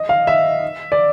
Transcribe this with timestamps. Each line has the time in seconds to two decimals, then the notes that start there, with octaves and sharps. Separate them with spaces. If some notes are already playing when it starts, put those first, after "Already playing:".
Already playing: D#5
0.09 F5
0.27 E5
0.92 D5